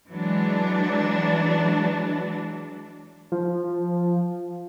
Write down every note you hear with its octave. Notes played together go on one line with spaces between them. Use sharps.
E3 F#3 G#3 D4
F3